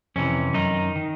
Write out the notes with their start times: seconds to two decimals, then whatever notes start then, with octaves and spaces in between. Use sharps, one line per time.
0.16 F2 C3 E3 C#4
0.54 F#2 D#3 D#4
0.96 D#3